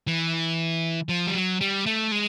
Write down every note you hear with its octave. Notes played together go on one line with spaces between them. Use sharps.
E3
F3
G3
F#3
G3
A3
G#3